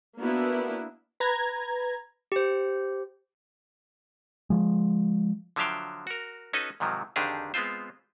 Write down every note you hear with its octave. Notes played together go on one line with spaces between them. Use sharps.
A#3 B3 D4 E4 F#4
B4 A#5 G#6
G4 C5
F3 G#3
D3 F3 F#3 E5 F5 G5
F#4 A#4
C#4 D#4 F#4 A4 B4 D#5
G#2 C3 D#3 F3 F#3
F2 D3 D#3 D4 G4 G#4
G#3 B3 C4 F4 C5